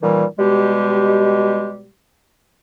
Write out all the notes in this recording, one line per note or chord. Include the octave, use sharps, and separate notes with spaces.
A#2 D#3 E3 G3
B2 G3 G#3 G4